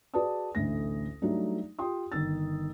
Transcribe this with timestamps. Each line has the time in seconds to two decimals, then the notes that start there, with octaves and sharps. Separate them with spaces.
0.14 F#4 G#4 B4 D5 A5 D#6
0.55 A1 D2 A3 A#6
1.22 F#3 G3 A3 D4 D#4
1.79 F4 G4 G5 C6 D#6
2.12 G1 D#3 E6 A6